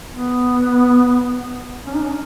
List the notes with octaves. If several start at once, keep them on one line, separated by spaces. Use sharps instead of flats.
B3
C#4
D#4
C#4